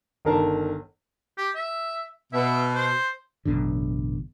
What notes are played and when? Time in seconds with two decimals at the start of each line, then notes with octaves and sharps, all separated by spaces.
0.25 G1 D#3 A#4 A5
1.38 G4
1.55 E5
2.33 B2 E5
2.74 C5
3.45 A1 F#2 B2 D3